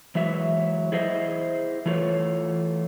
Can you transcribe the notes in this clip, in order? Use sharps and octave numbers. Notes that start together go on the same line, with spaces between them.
E3 F#3 G#3 E5
E4 G#4 C5 D#5 E5
E3 A3 F4 C#5